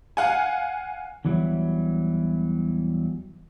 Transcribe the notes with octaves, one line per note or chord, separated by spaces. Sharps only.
F5 F#5 G#5
E2 E3 F#3 G3 E4